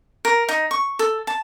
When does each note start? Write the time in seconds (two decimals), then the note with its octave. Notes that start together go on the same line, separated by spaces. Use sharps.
0.25 A#4
0.49 D#4
0.71 C#6
0.99 A4
1.27 A5